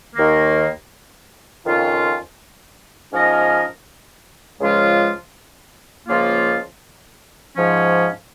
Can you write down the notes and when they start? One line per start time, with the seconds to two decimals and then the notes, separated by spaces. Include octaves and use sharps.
0.15 D#2 D#3 A#3
1.64 F2 D#3 C#4 F4
3.11 G#2 F3 C#4 A#4 D#5
4.59 C#2 C#3 F3 G#3 F4
6.07 C#2 C#3 F3 A#3 F4
7.55 G#2 F3 C#4